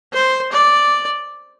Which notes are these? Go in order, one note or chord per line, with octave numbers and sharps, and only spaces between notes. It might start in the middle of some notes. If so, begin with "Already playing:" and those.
C5
D5